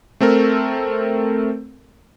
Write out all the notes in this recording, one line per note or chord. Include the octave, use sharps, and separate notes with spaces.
A3 C4 A4 A#4